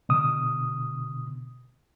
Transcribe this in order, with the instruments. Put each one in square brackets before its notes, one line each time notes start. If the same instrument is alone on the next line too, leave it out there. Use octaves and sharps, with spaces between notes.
[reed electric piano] B2 D3 D#6